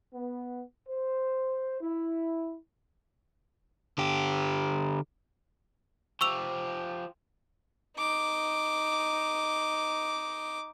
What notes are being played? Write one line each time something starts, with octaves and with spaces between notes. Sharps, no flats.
B3
C5
E4
D3 G4
F3 G4 C#6 E6 F7
D#4 D6